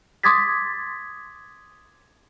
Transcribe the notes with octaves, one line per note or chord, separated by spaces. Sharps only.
C6 D6 D#6 G#6 A6 B6